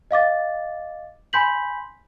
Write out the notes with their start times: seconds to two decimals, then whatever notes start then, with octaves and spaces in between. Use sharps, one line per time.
0.11 D#5 F5 D6 A6
1.33 G#5 B5 C6 G6 B6 F#7